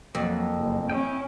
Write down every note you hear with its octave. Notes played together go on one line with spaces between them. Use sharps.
F2 F#3 A#3
F#1
C#4 E4 D#5 G5